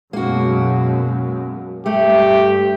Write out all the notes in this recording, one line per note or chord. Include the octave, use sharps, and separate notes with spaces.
F#2 B2 G#3 A#3 F#4
G2 A3 G4